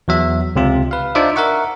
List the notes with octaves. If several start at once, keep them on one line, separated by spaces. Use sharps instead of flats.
E2 F#3 E5
C#2 C3 F4
B4 F5
D4 D#4 F4 C5 D5 E5
A#4 E5 F#5 C#6